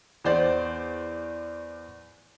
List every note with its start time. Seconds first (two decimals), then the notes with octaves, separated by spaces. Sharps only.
0.24 E2 C5 D5